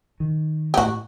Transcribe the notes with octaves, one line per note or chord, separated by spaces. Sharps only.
D#3
G4
A2 F#4